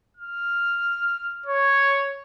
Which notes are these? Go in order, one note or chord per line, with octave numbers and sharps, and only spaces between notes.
F6
C#5